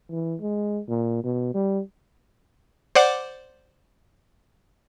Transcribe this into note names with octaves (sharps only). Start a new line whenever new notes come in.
E3
G#3
A#2
B2
G3
C5 D5 F#5 D6